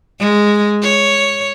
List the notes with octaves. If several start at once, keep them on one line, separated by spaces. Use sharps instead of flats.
G#3
C#5